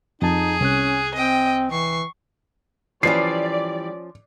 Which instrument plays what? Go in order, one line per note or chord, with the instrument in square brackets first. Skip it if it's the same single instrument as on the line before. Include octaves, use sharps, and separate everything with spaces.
[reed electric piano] F2 A5 [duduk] D#4 [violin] G#4
[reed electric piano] C2 G#5 F#6 [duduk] C#4
[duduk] C4 [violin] D#5 G5
[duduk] E3 [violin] C#6 C7
[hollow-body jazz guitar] E3 G3 [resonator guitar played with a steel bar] F3 C#4 [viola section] D5 [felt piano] C7